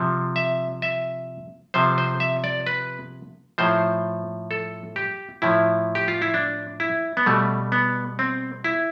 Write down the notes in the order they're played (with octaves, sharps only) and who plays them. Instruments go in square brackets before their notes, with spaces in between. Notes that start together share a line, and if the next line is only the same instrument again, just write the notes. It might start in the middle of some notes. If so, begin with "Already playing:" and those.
Already playing: [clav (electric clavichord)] C3 F3
E5
E5
C3 F3 C5
C5
E5
D5
B4
A2 F3 C5
A4
G4
A2 F3 E4
G4
F4
E4
D4
E4
B3
B2 G3 A3
B3
C4
E4